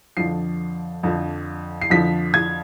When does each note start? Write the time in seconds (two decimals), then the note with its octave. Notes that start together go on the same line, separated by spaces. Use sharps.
0.17 F2 D3 F3 C7
1.03 F2 D3 F3
1.81 C7
1.90 F2 D3 F3 B6
2.34 G#6